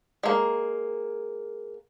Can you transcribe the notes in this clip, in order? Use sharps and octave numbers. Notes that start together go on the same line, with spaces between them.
G#3 A#3